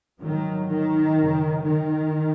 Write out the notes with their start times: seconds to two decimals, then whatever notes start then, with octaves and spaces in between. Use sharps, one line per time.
0.20 G#2 D#3 F#3
0.67 D#3
1.15 F#2 C#3
1.63 D#3